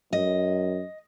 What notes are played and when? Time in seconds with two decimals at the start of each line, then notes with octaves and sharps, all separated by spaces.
0.13 F#2 D#5